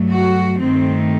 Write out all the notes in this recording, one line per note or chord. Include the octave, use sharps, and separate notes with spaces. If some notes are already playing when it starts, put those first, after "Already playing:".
Already playing: G2 F#3 A3
F#4
G2 D#3 A3 C4